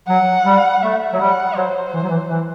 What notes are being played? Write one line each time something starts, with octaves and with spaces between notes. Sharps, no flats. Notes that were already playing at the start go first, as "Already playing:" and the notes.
F#3 F#5
G3
A3 E5
F#3
G3 F#5
F#3 C5
E3
F#3
E3
E3